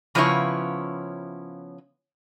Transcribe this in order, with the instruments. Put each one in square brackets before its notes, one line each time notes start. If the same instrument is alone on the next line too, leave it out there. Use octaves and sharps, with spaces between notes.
[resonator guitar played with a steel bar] C#3 F3 B3 C#4 E4 C#5